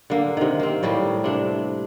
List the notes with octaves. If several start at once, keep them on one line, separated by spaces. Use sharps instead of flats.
D3 A#3
C3 D#3
A#3 C4
A2 G3 A#3 G4
C3 D4